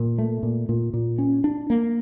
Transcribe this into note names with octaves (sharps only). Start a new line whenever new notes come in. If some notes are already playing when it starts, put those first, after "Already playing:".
Already playing: A#2
A3
A#2
A#2
A#2
C#4
D4
A#3